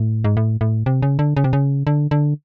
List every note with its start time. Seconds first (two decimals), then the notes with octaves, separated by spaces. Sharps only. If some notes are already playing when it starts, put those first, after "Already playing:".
Already playing: A2
0.24 G#2
0.37 A2
0.61 A2
0.86 C3
1.02 C#3
1.19 D3
1.37 C#3
1.44 C3
1.53 C#3
1.87 D3
2.11 D3